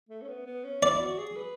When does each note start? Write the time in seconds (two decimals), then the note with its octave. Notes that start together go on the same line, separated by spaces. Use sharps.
0.09 A3
0.22 C#4
0.28 B3
0.46 B3
0.64 C#4
0.83 E4 D5
1.00 F#4
1.18 G#4
1.36 B4